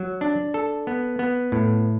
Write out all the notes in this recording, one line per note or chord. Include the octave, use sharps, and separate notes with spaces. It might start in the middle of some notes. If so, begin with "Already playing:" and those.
Already playing: F#3
D4
A4
B3
B3
A2